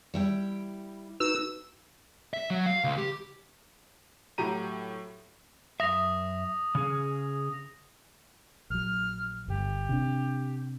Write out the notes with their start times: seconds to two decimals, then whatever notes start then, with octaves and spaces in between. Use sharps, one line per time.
0.14 G3 E4 G5
1.20 D#4 F#4 B4 E6
2.33 E5
2.50 F#3
2.66 F5
2.84 C#2
2.98 G4
4.38 A2 F#3 G4 A#5 D#7
5.80 F#2 E5 D#6 A#6 F7
6.75 C#3 C#4 G#4
8.70 A#1 F#3 F6
9.48 G1 G4
9.89 C3 D4